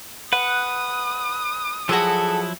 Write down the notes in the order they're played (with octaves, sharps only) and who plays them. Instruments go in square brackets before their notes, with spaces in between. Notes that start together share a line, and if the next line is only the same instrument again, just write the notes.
[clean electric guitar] B4 [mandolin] F#5 [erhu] D#6
[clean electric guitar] F3 F#3 E4 [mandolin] F#4 A4 [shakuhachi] G#4